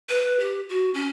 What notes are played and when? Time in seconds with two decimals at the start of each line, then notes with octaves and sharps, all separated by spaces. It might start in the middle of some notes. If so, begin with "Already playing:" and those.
0.09 B4
0.39 G4
0.69 F#4
0.94 C#4